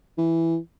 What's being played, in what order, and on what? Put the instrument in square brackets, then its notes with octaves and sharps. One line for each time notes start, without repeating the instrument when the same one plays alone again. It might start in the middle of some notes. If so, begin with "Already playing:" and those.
[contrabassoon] E3